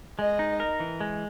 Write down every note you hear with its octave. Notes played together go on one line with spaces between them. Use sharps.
G#3 D#5
D#4
A#4
E3
G#3